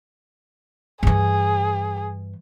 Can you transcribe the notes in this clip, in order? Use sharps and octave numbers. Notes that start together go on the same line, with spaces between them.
G2 E3 G#4